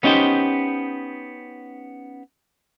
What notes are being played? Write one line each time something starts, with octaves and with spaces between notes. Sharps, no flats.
B3 C#4 D#4 G4 C5